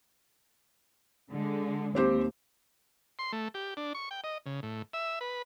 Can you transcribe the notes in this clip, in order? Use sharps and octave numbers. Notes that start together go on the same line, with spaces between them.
D3 G#3
D#2 C4 G4 C5
C6
A3
G4
D4
C#6
G5
D#5
C#3
A2
E5
B4